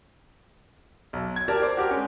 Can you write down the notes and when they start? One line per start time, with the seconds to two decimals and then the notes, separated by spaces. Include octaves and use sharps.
1.13 B1
1.36 G#6
1.48 G4 A#4 D5 A5
1.62 C5 D5
1.77 F#4 G4 A#4
1.91 G#3 C#4